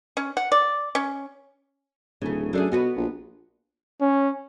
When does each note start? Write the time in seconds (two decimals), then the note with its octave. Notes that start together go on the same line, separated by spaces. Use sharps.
0.17 C#4
0.37 F#5
0.52 D5
0.95 C#4
2.22 D1 C#3 A3
2.53 F#2 A3 D4 G#4
2.72 B2 B3 F#4 B4
2.96 A#1
4.01 C#4